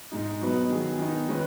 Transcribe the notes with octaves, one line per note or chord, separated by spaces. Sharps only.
G#2 G#3 D#4
B2 F#3 B3 D#4 B4
D#3 F#3 B3 G#4
D#3 B3 D#4
D#3 G#3 C#4 B4